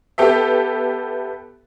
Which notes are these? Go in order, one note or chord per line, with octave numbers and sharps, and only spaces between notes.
B3 G4 A4 E5